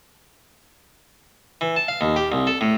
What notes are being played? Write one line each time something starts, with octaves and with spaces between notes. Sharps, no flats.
E3
A5
F5
D#2
G4
C2
A4
A2